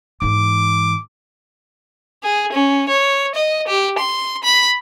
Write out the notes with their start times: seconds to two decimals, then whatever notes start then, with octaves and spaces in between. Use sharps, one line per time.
0.22 G#2 E3 D6
2.23 G#4
2.52 C#4
2.89 C#5
3.35 D#5
3.68 G4
3.98 C6
4.43 B5